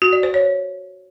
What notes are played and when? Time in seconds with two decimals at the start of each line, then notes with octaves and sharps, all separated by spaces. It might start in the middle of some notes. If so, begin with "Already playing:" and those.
0.02 F#4
0.13 D5
0.23 C5
0.34 C#5